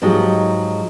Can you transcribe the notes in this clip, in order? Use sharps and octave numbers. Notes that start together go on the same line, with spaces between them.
G#2 F3 F#3 G#3 D#4 G4